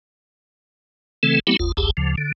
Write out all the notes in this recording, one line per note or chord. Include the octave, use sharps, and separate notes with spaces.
C#3 E3 A3 C4 A4
F#3 A3 B3 C4 E4 G4
F#1 D#2 F4
F#1 B1 E2 G4 G#4 A5
D2 C#3 F3
D3